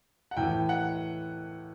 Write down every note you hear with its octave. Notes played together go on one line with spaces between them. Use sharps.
F#5
A2 E3 G5
F#5